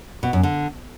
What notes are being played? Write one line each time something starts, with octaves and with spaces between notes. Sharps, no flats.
B2
F#2
D3